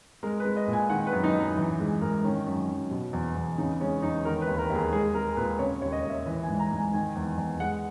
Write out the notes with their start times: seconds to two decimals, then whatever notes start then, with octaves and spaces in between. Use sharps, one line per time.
0.23 G#3 A#4
0.40 B4
0.45 G#3
0.56 D#5
0.68 A#2
0.73 G#5
0.90 D#3 F#5
1.07 B4
1.12 F#2
1.24 D#4
1.35 F#2
1.40 D#4
1.57 E3
1.79 G#2 G#4
2.01 G#2 A#4
2.24 D#3 C#4
2.46 F#2
2.68 F#2
2.91 B2
3.13 E2
3.36 E2
3.58 C#3 D#4
3.80 G#3 C#4
4.02 E2 D#4
4.25 D#3 A#4
4.41 B4
4.47 D#2
4.58 A#4
4.70 D#2
4.75 G#4
4.93 G#3 G#4
5.15 G#3 A#4
5.36 A#2 B4
5.59 C#3 C#5
5.81 D#2 C#5
5.92 D#5
6.04 D#2
6.09 E5
6.26 E3 E5
6.43 G#5
6.48 G#2
6.60 A#5
6.71 G#2
6.76 G#5
6.93 D#3 G#5
7.15 E2
7.38 E2
7.60 G#3 F#5